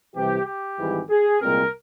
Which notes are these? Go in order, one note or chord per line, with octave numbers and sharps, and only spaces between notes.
C2 C3 E3 G4
G4
G#1 G#2 E3 G3
G#4
C2 A#2 G#3 C4 A#4